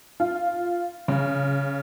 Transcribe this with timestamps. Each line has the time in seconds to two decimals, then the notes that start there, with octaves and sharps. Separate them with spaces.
0.20 F4
1.08 C#3